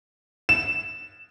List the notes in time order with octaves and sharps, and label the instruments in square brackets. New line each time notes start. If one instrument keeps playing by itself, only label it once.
[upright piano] E7